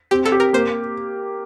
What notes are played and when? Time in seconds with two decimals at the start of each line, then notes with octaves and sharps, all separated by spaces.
0.11 C4 G4
0.25 A4
0.32 G4
0.40 A#4
0.53 A#3 C5